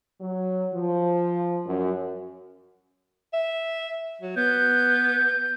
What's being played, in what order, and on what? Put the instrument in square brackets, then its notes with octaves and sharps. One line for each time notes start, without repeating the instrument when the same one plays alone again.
[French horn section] F#3
F3
F#2
[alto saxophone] E5
F#3
[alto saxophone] B3 [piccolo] G6